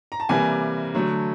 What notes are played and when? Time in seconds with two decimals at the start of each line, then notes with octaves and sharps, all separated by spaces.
0.12 A#5
0.20 A5
0.29 C3 E3 G3 A#3 G#5
0.95 D3 F#3 A3